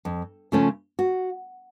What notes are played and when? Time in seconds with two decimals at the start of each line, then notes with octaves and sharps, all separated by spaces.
0.05 F2
0.52 C#3 F3 A3 C#4
0.99 F#4